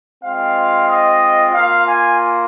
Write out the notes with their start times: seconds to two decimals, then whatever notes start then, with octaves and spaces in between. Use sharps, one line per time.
0.23 G#3 C4 F4 F5
0.88 D#5
1.53 A#3 F4 F5
1.86 G#5